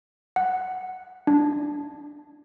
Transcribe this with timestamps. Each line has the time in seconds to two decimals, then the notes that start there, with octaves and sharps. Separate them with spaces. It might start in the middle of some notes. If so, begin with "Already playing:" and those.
0.36 F#5
1.27 D4